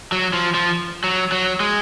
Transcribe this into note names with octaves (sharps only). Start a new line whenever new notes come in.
F#3
F3
F3
F#3
F#3
G#3